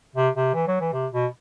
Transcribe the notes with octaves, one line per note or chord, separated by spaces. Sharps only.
C3
C3
E3
F#3
E3
C3
B2